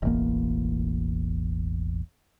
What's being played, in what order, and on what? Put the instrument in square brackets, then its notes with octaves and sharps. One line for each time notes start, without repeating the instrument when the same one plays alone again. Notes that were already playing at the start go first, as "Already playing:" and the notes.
[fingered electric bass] E1 A1 E2 A#3